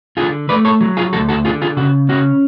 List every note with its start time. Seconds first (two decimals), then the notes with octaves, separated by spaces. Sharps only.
0.17 D3 F4 G#4
0.49 A3 B4 D5
0.65 A4 C#5
0.81 F#3
0.97 F4 G#4
1.13 D2 F#4 A4
1.29 F#4 A4
1.45 D3 F4 G#4
1.62 F4 G#4
1.77 C#3 F#4
2.09 C#4 F#4